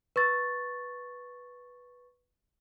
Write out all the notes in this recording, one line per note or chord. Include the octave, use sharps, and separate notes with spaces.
B4 C#6 A6